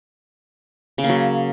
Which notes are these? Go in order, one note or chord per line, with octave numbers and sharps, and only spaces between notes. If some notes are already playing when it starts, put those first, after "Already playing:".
C#3
A#3
F#3